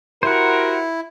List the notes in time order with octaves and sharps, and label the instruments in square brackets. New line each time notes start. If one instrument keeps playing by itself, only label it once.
[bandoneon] E4 [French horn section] F#4 G4 A#4 [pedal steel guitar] C5 F#5